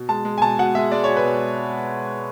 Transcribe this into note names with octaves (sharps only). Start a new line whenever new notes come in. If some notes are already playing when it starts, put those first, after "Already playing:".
Already playing: B2
G#3 A5
G#3
G#5
B2 A5
B2 F#5
G#3 E5
G#3 D5
B2 C#5
B4
B2